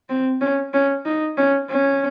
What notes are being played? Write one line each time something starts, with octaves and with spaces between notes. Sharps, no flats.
C4
C#4
C#4
D#4
C#4
C#4